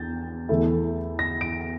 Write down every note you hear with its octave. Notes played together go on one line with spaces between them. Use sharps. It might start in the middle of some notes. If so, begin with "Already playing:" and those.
Already playing: E2 D3 G6 A6
E2 E3 A3 E4
A#6
D7